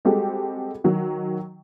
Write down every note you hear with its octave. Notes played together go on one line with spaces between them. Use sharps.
G3 G#3 C4 F#4 G4 A4
D#3 F#3